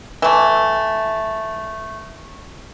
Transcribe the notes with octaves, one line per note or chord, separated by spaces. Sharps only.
E3 A3